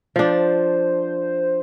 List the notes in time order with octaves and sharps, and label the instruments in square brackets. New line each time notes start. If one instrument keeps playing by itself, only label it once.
[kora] F3 D4 [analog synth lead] C5